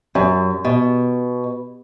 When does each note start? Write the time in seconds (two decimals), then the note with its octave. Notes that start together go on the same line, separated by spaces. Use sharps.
0.15 F#2
0.65 B2